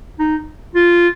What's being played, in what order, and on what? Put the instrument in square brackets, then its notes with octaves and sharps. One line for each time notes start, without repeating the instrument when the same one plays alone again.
[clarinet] D#4
F4